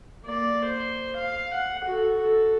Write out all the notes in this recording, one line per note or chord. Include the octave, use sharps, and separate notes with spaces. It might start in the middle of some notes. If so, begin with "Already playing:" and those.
A#3 D5
C5
F5
F#5
F#4 A4
A4